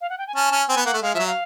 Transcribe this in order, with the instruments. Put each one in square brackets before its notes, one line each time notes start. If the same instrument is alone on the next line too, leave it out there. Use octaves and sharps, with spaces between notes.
[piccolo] F5
F#5
G5
G#5
[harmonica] C#4 [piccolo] A5
[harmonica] C#4
[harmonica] C4 [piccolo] G#5
[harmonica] B3
[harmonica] A#3 [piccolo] F#5
[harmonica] A3
[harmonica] G#3 [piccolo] F5
[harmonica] F3 [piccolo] E5
[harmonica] F#3
[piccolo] F5